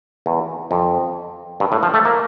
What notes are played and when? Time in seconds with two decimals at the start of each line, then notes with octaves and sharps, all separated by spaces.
0.26 E2
0.71 F2
1.60 G2
1.72 A2
1.83 F3
1.94 A3
2.05 A#3